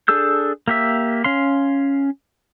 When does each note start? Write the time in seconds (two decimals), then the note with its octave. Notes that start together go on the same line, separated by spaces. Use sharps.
0.08 D4 G#4 A4 E6 G6
0.68 A#3 G4 E5
1.24 C#4 F5 C6